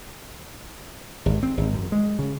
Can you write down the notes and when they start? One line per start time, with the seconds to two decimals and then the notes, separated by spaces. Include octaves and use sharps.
1.26 G#1
1.43 C4
1.57 G#1
1.74 F#2
1.92 G#3
2.19 C#3